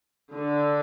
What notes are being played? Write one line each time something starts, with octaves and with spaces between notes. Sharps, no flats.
D3